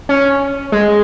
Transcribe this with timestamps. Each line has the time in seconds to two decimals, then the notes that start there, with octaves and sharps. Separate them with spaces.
0.09 C#4
0.72 G#3